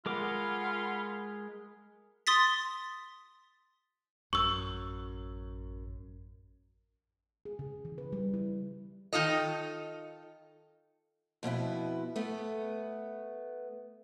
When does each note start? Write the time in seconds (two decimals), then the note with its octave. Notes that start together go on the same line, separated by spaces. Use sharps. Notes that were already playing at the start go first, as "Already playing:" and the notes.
0.06 G#3 F4 A#4 F#5 B5 D6
2.27 C6 D#6 A6 B6
4.33 A1 F#2 C#6 E6
7.45 G#4
7.59 C#3
7.85 E3
7.98 B4
8.12 G3
8.34 E4
9.13 D#3 D#4 F4 A4 D#5
11.43 F2 B2 B3 E4
12.16 A3 B3